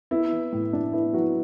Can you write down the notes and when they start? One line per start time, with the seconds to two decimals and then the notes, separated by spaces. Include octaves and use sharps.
0.11 B3 E4
0.32 E3
0.52 A2
0.73 A2 D4
0.93 B3 E4
1.14 E3 F#3 F#4